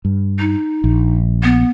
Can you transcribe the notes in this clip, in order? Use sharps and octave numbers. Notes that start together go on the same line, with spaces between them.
G2
D#4
A#1
B3